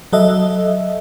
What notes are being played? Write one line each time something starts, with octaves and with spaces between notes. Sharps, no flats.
F#3 A4 D#5 E5